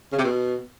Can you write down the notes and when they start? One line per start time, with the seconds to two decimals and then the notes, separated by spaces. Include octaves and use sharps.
0.12 C#3
0.18 C3
0.24 B2